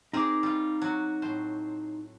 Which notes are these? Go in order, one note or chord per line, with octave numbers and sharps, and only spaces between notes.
C4 D#4 G#4 A#4 D6
G3 F4
F#3 F#4
A2 C5